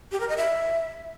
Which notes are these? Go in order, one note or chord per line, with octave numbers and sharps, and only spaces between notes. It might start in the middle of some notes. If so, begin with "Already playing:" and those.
G4
A#4
D#5
E5